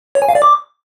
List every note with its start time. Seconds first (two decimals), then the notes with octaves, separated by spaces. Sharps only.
0.15 C#5
0.22 G#5
0.29 F5
0.35 D5
0.42 D6